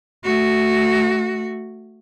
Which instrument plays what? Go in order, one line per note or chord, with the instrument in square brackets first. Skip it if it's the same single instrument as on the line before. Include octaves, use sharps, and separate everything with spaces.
[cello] A3 F#4